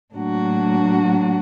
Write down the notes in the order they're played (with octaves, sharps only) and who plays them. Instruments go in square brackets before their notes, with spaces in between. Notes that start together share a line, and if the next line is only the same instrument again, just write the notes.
[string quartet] A2 F#3 A#3 D4 F#4